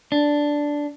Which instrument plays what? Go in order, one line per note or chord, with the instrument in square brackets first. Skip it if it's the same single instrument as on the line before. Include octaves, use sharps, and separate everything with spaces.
[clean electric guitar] D4